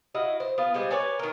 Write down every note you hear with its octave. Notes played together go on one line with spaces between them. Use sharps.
E4 F#4 D#5 F5
C5
B3 F4
G3 G#3 C5 D#5
B4 C#5 D5 G#5
D#3 A#4